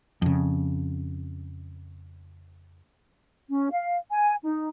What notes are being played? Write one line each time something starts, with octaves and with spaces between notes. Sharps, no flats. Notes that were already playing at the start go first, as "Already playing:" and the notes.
F2 C#3
C#4
F5
G#5
D#4